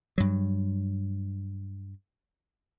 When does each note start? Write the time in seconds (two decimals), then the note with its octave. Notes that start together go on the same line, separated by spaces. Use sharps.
0.18 G2 F#3